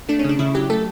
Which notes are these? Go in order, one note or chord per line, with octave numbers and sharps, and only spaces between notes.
A3 D4
C#4
C#3
D4
C#3 E4
F#3 G4
A3 A4